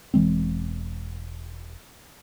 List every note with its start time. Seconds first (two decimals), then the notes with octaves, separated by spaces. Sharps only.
0.14 E1 E3 G#3 C4